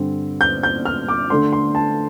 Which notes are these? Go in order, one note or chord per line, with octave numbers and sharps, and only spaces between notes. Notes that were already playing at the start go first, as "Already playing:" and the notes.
Already playing: G2 D3 G3 C4
G6
G6
F6
D6
D3 A3 D4 C6
C6
A5